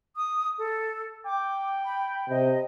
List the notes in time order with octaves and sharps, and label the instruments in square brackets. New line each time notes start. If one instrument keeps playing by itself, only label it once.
[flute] D#6
A4
[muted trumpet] G5 [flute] D6
[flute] B5
[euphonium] C3 [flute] D#5